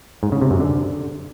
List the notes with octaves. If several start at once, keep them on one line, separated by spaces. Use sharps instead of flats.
G#2
C#3
C3
F#2
D3